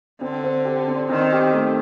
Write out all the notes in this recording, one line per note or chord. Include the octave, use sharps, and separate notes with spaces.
D3 C4
C5
G4
C4
D#3 C4
G4
A3